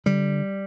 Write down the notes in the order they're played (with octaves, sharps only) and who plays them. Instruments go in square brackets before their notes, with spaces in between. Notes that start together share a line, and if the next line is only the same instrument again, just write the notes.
[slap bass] D3 G3